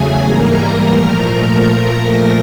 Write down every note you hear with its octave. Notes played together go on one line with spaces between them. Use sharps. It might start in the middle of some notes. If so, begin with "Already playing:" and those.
Already playing: E2 C#3 F#3 A3 G#4 G#5
G#2 E3 G3 A#3 A#4 A#5
A#2 F3 A3